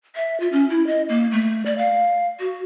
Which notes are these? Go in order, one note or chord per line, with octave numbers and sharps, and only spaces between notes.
E5
F4
C#4
E4
D#5
A#3
A3
D5
F5
F#4